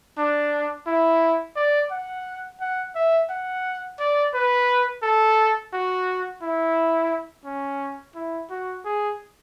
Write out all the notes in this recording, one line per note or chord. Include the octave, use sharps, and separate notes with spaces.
D4
E4
D5
F#5
F#5
E5
F#5
D5
B4
A4
F#4
E4
C#4
E4
F#4
G#4